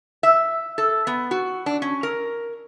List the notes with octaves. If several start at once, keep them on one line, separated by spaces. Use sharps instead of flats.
E5
A4
B3
F#4
D4
C#4
A#4